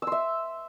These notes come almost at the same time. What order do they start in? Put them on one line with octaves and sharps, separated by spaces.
E6 C6 E5